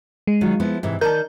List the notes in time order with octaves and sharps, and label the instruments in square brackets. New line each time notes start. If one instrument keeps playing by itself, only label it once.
[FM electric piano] G#3
[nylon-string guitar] D#3 F#3 F4
F3 B3 E4
G#2 C3 E3
[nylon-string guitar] D#3 D5 A5 [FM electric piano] A#4 G6